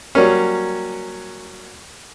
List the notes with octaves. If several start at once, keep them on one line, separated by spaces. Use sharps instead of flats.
F#3 G3 A#3 C#4